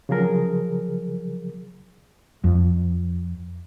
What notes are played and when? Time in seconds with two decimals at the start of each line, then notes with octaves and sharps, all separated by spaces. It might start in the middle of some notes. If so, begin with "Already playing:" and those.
0.09 C#3 F3 F#3 G#4 A#4
2.44 F2